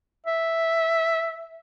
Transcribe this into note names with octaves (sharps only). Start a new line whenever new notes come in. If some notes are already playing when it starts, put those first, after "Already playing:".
E5